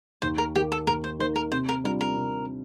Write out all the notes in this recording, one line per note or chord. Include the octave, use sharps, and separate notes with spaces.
D#2 C5
A#4
D#3 A#3 G4
A4
D#2 A#4
C5
D#3 A#3 C5
A#4
C3 C5
A#4
G3 D4 F4 A#4
A#4
C3